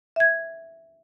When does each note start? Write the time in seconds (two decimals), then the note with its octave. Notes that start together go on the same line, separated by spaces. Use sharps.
0.16 E5 G#6